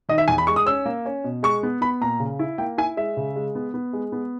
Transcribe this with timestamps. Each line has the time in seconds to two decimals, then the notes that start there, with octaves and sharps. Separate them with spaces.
0.09 D#3 D#5
0.18 E5
0.28 E2 G#5
0.38 B5
0.47 G#3 C#6
0.56 D#6
0.66 C#4 E6
0.86 A#3
1.06 C#4
1.24 B2
1.43 G#3 C#6
1.63 B3
1.81 B3 B5
2.01 A#2 A#5
2.20 C#3
2.39 E4
2.58 A#3 G5
2.78 E4 G#5
2.97 G#3 E5
3.17 C#3
3.36 G#3
3.55 B3
3.74 B3
3.93 G#3
4.12 B3